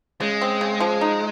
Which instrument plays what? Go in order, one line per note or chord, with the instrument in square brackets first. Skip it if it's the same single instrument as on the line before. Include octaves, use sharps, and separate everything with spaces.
[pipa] C#3 [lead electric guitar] G#3
[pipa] C4
C#3
F3
D#4